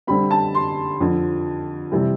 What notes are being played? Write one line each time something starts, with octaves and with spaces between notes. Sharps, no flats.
D3 G3 C4 B5
A5
C6
F2 D3 F3
C3 E3 G3 C4